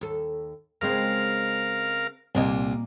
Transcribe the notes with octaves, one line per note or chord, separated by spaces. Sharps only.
D#2 A4
C#3 G#3 C4 A#4 F5
C2 A#2 A#3 D#5